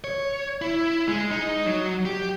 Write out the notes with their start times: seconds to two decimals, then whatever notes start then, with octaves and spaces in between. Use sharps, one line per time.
0.04 C#5
0.62 E4
1.08 G#3
1.31 D#4
1.66 F#3
2.05 G4